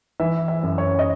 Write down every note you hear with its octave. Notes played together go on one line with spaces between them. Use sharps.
E3 E5
E5
F#2
C#5
D#5